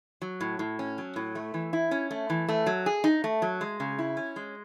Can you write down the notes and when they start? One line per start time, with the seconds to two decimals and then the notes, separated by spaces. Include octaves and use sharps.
0.22 F#3
0.41 A2
0.59 A2
0.79 C#4
0.98 F#3
1.16 A2
1.35 A3
1.54 E3
1.73 E4
1.91 C#4
2.11 A3
2.30 E3
2.49 A3
2.66 F#3
2.86 G#4
3.04 D#4
3.24 A3
3.42 F#3
3.61 G#3
3.80 C#3
3.99 E4
4.17 C#4
4.36 G#3